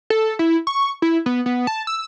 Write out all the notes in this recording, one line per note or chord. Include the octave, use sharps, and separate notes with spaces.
A4
E4
C#6
E4
B3
B3
A5
E6